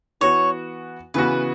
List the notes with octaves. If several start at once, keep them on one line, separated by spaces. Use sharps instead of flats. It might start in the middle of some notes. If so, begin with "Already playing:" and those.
E3 B3 F#4 C#5
C#3 E3 B3 F#4 B4